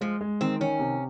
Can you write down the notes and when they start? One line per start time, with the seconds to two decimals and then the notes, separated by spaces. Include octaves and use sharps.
0.01 F3 G#3
0.21 G#3
0.41 D#3 C4
0.60 D#3 C#4
0.79 C3